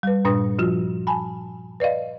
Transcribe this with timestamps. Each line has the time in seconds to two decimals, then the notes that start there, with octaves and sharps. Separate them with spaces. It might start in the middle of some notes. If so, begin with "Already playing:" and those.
0.03 G3 B4
0.25 G2 A#2 D4 B4 D#6 A#6
0.59 F3 F4 F#4
1.07 G#5 A5 B5
1.80 B4 D5 D#5 F5